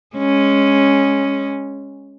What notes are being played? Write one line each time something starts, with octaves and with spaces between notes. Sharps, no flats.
G#3 C#4